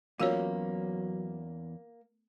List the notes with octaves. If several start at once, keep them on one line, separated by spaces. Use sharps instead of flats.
E2 F#3 A#3 C#4 F4 F#4 C#5